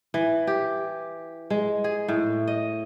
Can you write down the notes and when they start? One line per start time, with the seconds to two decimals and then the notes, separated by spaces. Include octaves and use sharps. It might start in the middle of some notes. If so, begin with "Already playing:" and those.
0.14 E3
0.47 G4
1.50 G#3
1.84 G#4
2.09 A2
2.47 D#5